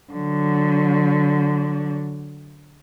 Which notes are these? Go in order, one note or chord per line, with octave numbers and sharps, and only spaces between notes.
D3 F#3